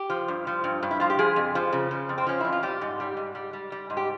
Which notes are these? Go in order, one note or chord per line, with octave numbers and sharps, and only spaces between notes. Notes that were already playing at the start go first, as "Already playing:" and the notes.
Already playing: G4
F3
G2
F3
G2
G2
E4
F3 F4
G4
F3 G#4
F2
F3
C#3
F3
F2
C4
F3 C#4
F2 E4
F4
G3 G4
G#2
G3
G#2
G3
G3
G3
G#2
G4